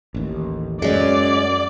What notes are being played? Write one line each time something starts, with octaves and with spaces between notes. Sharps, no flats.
A1 D#2
F#2 G#3 C#4 D5